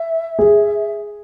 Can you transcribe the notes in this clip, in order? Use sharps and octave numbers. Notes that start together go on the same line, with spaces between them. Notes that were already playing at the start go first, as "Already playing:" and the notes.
Already playing: E5
G#4